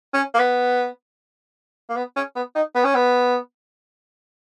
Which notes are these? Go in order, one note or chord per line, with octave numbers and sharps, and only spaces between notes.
C#4
A#3
B3
A#3
B3
C#4
B3
D#4
B3
C#4
B3